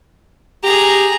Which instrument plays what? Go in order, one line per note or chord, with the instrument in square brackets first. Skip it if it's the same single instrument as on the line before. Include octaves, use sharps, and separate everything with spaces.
[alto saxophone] G4 [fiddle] G#4 A#5